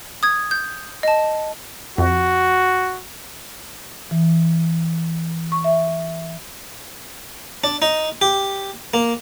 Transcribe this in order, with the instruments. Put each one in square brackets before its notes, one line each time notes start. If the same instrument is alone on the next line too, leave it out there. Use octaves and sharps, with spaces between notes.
[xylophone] D#6 G#6
G6
D#5 A5
[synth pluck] F2 [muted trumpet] F#4
[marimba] E3
C#6
E5
[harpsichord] D4
D#4
G4
A#3